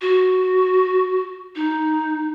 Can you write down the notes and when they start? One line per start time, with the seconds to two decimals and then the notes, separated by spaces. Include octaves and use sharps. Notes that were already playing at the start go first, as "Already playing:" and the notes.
0.01 F#4
1.56 D#4